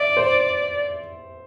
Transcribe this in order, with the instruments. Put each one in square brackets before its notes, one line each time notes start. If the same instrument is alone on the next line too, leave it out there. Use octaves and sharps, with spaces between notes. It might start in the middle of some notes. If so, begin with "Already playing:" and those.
Already playing: [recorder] D5 [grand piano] E5
[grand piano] C5